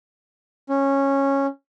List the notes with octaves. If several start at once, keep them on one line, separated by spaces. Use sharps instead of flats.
C#4